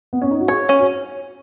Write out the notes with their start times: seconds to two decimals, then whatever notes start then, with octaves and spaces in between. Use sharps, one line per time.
0.13 B3
0.22 C#4
0.31 D#4
0.40 F#4
0.48 G#4 C#5
0.69 C#4
0.79 F#4